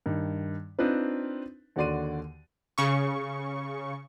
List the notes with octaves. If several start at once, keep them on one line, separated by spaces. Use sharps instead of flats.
G2 D#3
C4 D4 D#4 F4 B4
D#2 D3 F#4 D5 C6 D#7
C#3 C#6